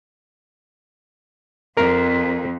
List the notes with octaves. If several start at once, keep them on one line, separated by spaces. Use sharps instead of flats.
F2 A#4 A#5